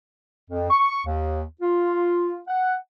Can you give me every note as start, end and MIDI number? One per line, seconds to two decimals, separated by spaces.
0.50 0.69 41
0.70 1.05 85
1.06 1.42 39
1.62 2.41 65
2.48 2.75 78